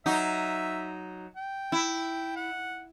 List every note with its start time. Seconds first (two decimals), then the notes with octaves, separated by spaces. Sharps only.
0.06 F#3 D#4 E5
1.36 G5
1.72 E4
2.36 F#5